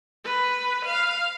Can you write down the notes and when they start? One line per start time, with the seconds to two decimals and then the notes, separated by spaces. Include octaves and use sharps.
0.25 B4
0.85 F5